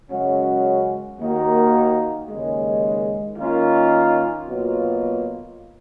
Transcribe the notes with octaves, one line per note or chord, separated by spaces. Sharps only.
F#2 C#3 G#3 C#4 F#4
D#2 D#3 A#3 D#4 F#4
D#2 C#3 G#3
D#3 A#3 C#4 F4
B2 F#3 A#3 F4